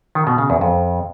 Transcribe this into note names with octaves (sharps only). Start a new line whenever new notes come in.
D#3
B2
C#3
E2
F2